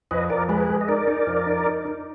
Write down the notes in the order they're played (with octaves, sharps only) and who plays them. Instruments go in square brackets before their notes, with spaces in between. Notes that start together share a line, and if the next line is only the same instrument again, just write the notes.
[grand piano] F2 [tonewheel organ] B4 D#5
[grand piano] F2 [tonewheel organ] A#4 D5
[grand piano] G#3 [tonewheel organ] G#4 B4
[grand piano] G#3
[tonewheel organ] D#5
[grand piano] D#4 [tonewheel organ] A#4 D5
[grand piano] D#4
F2
D#4
D#4
D#4